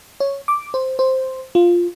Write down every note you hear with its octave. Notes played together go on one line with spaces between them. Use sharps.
C#5
D6
C5
C5
F4